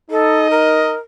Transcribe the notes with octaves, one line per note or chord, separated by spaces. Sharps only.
D#4 A4 D#5
A#4